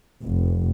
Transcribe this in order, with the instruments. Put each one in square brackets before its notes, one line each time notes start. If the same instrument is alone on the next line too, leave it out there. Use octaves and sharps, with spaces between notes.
[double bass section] F1